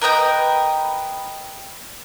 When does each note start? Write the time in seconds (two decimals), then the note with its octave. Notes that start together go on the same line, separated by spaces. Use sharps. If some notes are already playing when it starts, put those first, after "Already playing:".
0.02 A#4 B4 D#5 G5